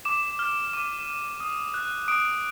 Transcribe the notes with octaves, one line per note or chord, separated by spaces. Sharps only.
D6 E7
F6
D6 D#7
F6
D#6
F#6
D#6 D7